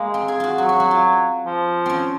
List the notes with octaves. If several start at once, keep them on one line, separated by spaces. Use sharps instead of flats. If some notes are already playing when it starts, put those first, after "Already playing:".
Already playing: G#3 A#3
C4
G#4
F4 F#4
F#3 F#4
F#4
F#4
F4
F3
C4 C#4